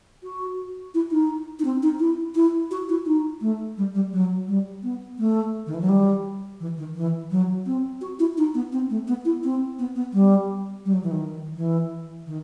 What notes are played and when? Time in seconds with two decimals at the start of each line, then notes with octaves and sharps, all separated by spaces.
0.23 F#4
0.94 E4
1.11 D#4
1.59 D#4
1.65 C4
1.82 D#4
2.00 E4
2.35 E4
2.71 F#4
2.89 E4
3.06 D#4
3.41 A3
3.77 G3
3.94 G3
4.13 F#3
4.48 G3
4.83 B3
5.19 A3
5.67 D#3
5.74 E3
5.81 F#3
5.89 G3
6.60 E3
6.78 D#3
6.95 E3
7.31 F#3
7.66 C4
8.01 F#4
8.19 E4
8.38 D#4
8.54 B3
8.72 C4
8.90 A3
9.07 B3
9.25 E4
9.44 C4
9.79 B3
9.96 B3
10.13 G3
10.85 G3
10.93 F#3
11.03 E3
11.11 D#3
11.56 E3
12.27 D#3